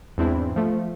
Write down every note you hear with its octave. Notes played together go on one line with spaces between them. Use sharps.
E2 G#2 C4 D4 E4
F3 A3